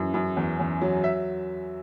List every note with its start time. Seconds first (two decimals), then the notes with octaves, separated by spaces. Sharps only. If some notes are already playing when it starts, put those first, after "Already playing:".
Already playing: F#2 E3
0.14 F#2
0.37 E2
0.59 E2
0.81 F#3
1.04 E5